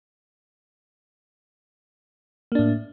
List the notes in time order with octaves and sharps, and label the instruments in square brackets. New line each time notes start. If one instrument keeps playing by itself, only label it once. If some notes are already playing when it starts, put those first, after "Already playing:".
[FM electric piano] A#3
D4
A2